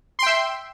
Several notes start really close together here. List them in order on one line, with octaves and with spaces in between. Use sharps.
C6 G5 E5